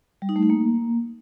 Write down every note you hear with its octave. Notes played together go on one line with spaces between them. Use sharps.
G3
D#4
A3
D#4
A#3